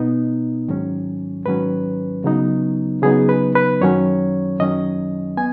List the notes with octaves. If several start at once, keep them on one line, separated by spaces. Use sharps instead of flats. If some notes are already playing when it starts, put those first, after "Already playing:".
Already playing: B2 B3 D#4
G#2 D#3 F#3 C#4
G#2 D#3 F#3 C#4 B4
C#3 F#3 B3 D#4
C#3 F#3 B3 D#4 G#4
B4
B4
F#2 D#3 F#3 C#4 C#5
F#2 D#3 F#3 C#4 D#5
B3 G#5